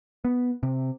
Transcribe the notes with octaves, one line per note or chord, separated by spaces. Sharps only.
B3
C3